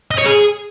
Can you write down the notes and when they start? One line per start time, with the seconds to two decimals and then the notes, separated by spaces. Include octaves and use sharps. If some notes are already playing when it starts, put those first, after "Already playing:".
0.11 D#5
0.18 C#5
0.26 G#4